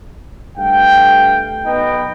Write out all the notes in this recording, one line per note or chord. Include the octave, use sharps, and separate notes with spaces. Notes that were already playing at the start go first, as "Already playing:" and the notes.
G2 A3 F5 G5
B1 B3 D#4 B4 D#5 G5